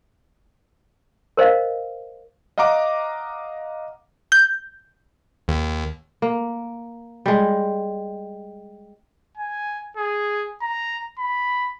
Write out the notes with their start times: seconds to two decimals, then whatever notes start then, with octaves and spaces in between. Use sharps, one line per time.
1.37 A#4 C5 D#5 F5
2.58 D#5 F5 F#5 A#5 D6
4.32 G6
5.48 D#2
6.22 A#3
7.26 G3 G#3
9.37 G#5
9.97 G#4
10.62 A#5
11.19 B5